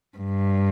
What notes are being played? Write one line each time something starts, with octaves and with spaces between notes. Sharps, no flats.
G2